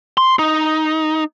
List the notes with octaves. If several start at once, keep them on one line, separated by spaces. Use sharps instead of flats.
C6
D#4